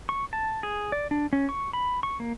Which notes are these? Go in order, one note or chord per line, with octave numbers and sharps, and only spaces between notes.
C#6
A5
G#4
D5
D4
C#4
C#6
B5
C#6
A#3